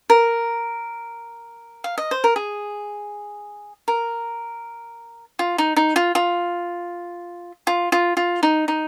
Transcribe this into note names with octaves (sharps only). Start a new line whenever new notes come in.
A#4
F5
D#5
C5
A#4
G#4
A#4
F4
D#4
D#4
F4
F4
F4
F4
F4
D#4
D#4